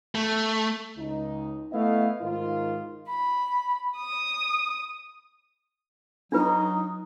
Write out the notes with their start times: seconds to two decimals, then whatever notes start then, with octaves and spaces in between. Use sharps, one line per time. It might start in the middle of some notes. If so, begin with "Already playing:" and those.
0.15 A3
0.98 C#2 D#4
1.73 A3 B3 E4 D#5 F5
2.21 G#2 D#3 F4
3.09 B5
3.97 D#6
6.32 F#3 D4 D#4 F4 B4